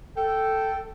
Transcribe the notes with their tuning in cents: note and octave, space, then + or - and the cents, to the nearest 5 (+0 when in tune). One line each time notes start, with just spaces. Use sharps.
A4 +5 G5 -10